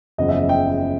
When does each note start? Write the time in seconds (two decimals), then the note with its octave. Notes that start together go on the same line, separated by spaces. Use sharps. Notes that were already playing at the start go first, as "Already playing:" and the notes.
0.18 F#1 E2 C#3 F3 D#5
0.29 E5
0.49 G5